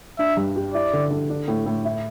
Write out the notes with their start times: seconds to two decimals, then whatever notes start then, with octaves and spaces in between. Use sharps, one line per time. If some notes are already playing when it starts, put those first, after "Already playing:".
0.19 D4 E5
0.37 G2
0.56 G4
0.74 E4 D5
0.93 D3
1.11 D3
1.30 D4
1.48 A2
1.66 A2
1.85 E4